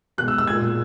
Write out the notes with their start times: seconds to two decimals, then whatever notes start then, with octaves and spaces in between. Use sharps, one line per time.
0.18 B2 F#6
0.22 G#3
0.28 E6
0.38 E6
0.47 A#2 G#3 G#6